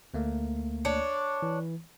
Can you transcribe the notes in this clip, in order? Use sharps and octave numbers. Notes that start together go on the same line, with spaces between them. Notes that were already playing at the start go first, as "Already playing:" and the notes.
D2 A3 A#3
D4 C#5
E3